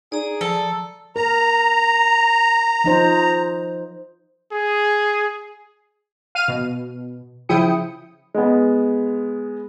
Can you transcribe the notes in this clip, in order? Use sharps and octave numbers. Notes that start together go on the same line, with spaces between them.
D#4 G#4 D5 A#5
F3 A4
A#4 A#5
F3 D#4 C5
G#4
F5 F6 D#7
B2
C#3 F3 E4 G5 D#6 C#7
G#3 B3